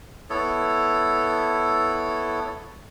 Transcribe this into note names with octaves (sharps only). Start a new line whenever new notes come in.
B3 E4 A4 C#5